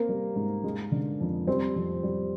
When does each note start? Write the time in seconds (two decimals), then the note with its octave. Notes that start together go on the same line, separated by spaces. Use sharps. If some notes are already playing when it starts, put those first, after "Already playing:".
Already playing: A#3 C4 A#4
0.09 G3
0.36 G#2
0.64 G#3
0.91 D3
1.20 F2
1.47 G3 C4 C5
1.76 F2
2.03 G3